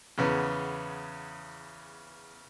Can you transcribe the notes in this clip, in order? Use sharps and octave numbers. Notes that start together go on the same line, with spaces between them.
E2 C#3 B3